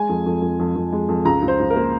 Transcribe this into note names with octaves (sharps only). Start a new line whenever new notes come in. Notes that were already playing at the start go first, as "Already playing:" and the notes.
Already playing: G#3 G#5
F2
F2
F2
F2
F2
G#3
F2
C#2 A#5
C#2
C5
C#2
A#4
A#3